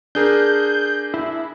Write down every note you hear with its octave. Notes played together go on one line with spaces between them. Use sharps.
D4 G#4 A#4 G6
E4